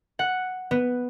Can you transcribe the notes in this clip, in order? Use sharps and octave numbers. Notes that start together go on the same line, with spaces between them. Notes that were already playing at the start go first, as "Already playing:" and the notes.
F#5
B3